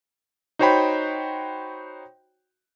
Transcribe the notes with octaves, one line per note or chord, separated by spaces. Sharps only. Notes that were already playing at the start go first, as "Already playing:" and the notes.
D#4 F#4 C5 C#5 G5 B5